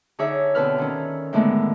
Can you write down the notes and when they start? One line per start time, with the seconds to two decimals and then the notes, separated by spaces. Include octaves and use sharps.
0.19 D3 D#4 G#4 C#5 E5
0.55 B2 D3 C4 A4 B4 F6
0.78 D#3 C#4
1.33 A2 D3 D#3 G#3 A3 B3